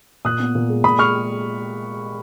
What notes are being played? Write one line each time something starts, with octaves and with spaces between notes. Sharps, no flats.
A#2 D#6 F#6
B3
A#2
G#3
A#2 B5 D#6
G#3 C#6 F6